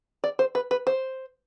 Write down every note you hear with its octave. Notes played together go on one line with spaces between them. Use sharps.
D5
C5
B4
B4
C5